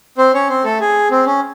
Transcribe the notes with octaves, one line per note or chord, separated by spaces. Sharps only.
C4 C5
C#4 C#5
C4 C5
A3 A4
G#4
C4
C#4